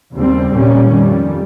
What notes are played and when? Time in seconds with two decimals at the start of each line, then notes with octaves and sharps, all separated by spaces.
0.15 D#2 C#3 G3 C4
0.53 A#2 G3 A#3 C#4
0.91 F2 D#3 G3